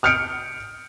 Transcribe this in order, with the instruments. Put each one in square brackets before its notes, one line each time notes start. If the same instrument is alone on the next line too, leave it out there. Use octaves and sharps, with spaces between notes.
[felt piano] D#6 F6 G6 C#7 D7